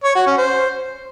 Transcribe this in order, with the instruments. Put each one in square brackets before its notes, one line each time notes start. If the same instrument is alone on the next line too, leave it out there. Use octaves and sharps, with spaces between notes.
[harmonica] C#5
F#4
C#4
C5